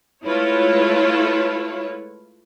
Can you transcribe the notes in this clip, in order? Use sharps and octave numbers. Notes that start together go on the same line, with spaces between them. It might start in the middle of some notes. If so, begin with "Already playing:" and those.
G#3 A3 E4 F4 B4 C#5